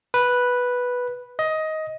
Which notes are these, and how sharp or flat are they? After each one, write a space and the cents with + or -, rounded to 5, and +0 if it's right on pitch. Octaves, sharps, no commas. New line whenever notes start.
B4 -5
D#5 +15